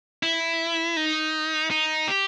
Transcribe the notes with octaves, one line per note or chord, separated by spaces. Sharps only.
E4
D#4
D#4
G4